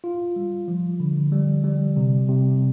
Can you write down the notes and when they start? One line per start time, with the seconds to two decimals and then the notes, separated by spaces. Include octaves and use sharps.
0.04 F4
0.36 G3
0.68 F3
1.00 D3
1.32 G3
1.64 G3
1.97 C3
2.29 C3